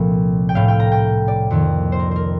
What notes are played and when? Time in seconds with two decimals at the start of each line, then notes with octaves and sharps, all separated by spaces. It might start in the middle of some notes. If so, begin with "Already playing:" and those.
Already playing: C2 A#2 F3 A3
0.49 G5
0.55 A2 A3 F5
0.68 G5
0.80 A#5
0.92 G5
1.28 D5
1.51 F2 D#3 A#3
1.92 C5
1.99 A#4
2.11 A#4 C5